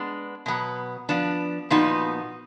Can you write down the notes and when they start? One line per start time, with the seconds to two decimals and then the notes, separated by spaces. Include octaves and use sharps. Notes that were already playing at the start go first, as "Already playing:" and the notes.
Already playing: G#3 B3 D4
0.46 B2 F#3 B3
1.09 F3 B3 D4
1.70 A#2 F3 B3 D#4 F#4